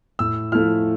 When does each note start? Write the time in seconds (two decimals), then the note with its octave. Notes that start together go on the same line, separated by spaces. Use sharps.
0.19 A2 E6
0.52 F3 A3 E4 F6